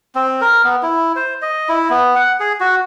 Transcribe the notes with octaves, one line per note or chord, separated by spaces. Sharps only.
C4
A#4
B3
E4
C5
D#5
E4
B3
F#5
G#4
F#4